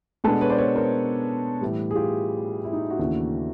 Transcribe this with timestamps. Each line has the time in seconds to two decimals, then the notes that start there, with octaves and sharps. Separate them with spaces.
0.24 B2 G#3 B3 D4 A4 B4
0.41 B4 C#5
0.49 C5 D5
0.58 B4 C#5
0.75 A#4 C5
1.61 A2 E3 G3
1.91 G#4
1.95 F4 G4
2.64 E4
2.73 D#4
2.90 E4 F#4
2.99 D#2 C#3 E3 A3 D4